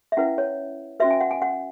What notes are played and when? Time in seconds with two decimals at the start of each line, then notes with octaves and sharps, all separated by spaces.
0.12 E5
0.17 C#4 E4 B4 F#5
0.38 C#5
1.00 C#4 F#4 B4 E5
1.10 G#5
1.21 F#5
1.31 G#5
1.42 F#5